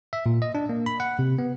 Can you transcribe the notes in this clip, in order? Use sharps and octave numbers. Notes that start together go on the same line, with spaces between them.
E5
A#2
D#5
D4
A#3
B5
F#5
C3
B3